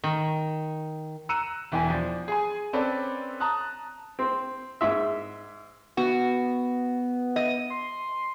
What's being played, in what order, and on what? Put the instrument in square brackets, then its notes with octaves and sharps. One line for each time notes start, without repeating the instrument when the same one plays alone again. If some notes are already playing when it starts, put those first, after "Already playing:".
[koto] D#3
[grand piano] A#5 E6 F#6 C#7 D#7 E7
E1 E3 G5 G#5
F3 D4
G#4 G#5
C4 C#4 A4 B4 D5
A5 A#5 D#6 F#6
[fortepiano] C4
G#2 E5
[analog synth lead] B3 [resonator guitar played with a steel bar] F#4
[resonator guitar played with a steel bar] D#5
[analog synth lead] C6